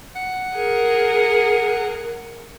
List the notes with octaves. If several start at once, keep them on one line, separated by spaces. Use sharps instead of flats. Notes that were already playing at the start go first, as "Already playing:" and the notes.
F#5
G#4 A#4